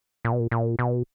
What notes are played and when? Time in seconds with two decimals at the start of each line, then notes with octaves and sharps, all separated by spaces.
0.25 A#2
0.32 B2
0.40 A#2
0.51 A#2
0.79 B2